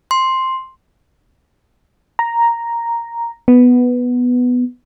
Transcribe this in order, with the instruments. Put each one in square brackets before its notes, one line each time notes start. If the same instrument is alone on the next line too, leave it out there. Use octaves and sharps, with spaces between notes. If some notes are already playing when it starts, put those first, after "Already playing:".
[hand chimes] C6
[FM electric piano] A#5
B3